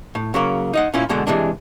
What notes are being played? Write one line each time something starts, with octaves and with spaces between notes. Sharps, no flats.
A2
C#3 F#3 A#3
D#4 D#5 F#5
A#2 C#4 E4 F4
B2 D3 G#3 F#5
C3 E3 G#3 D4